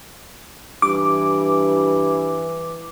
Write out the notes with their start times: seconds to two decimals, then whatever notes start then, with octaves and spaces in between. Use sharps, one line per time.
0.82 G2 E3 D6